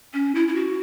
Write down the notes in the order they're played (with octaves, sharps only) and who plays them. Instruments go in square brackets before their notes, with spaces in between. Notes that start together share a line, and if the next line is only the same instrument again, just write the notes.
[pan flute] C#4
E4
E4
F#4